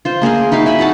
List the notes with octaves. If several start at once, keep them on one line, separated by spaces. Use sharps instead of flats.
F4 C5
A#3 G#4 A#4 G#5
D#4 E4 F#4 F5
E5 G#5 B5
D#4 F#4 F#5 A5